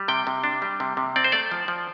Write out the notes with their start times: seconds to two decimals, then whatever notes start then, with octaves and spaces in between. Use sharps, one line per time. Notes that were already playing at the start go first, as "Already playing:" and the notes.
Already playing: G3
0.08 C3 G5
0.27 C3
0.44 D4
0.62 G3
0.80 C3
0.97 C3
1.16 C4 D5
1.24 C5
1.32 A3 D5
1.52 F3
1.68 F3